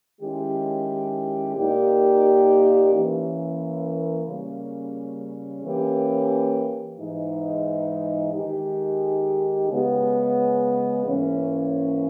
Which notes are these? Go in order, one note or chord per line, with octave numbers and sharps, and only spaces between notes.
D#3 G#3 C#4 E4 G4
A#2 A#3 D#4 G4
E3 A#3 C#4
C#3 G3 A#3 C#4
E3 A#3 C#4 G4
G#2 E3 G#3 D#4
D#3 G#3 D#4 G4
C#3 G#3 B3
G#2 E3 A#3 C#4